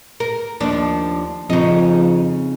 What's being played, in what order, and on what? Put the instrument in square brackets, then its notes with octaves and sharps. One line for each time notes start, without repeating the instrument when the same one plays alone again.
[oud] A#4
D#2 F3 D4
[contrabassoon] F2 [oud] C#3 D#4